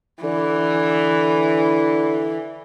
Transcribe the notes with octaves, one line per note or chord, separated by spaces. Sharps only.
D3 E3